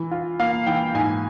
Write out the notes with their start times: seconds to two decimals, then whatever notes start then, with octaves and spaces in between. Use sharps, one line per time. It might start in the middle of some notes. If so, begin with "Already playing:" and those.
Already playing: E3
0.11 F4
0.40 A#3 F5
0.67 E3 G5
0.94 G#2 G#5